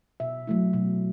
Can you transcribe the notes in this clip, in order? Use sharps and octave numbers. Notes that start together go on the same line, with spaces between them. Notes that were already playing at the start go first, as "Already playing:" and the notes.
B2 E5
F#3 A3 E4
B2